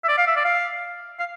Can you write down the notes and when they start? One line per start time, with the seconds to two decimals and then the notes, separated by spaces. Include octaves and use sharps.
0.04 E5
0.08 D5
0.18 F5
0.27 E5
0.36 D5
0.45 F5
1.19 F5